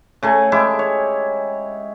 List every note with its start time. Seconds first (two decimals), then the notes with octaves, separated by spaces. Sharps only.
0.23 C#3 A3 G#5
0.52 G#3 E4 G4 D6
0.79 C#5